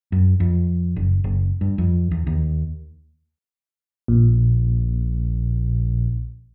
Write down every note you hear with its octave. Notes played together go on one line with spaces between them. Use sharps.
F#2
F2
F#1
F#1
G2
F2
E2
D#2
A#1 A#2